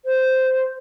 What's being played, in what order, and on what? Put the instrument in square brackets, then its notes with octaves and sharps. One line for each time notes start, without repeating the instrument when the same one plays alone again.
[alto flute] C5